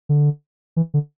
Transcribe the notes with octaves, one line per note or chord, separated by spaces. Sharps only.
D3
E3
D3